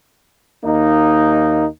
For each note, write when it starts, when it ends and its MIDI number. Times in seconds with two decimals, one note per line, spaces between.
0.64 1.66 39
0.64 1.66 58
0.64 1.66 63